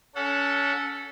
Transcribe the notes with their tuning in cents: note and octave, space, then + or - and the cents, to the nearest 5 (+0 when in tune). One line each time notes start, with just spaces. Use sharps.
C#4 +25 A4 +0 F#5 -20